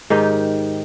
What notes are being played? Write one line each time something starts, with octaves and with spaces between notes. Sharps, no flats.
G#2 D#3 D#4 G4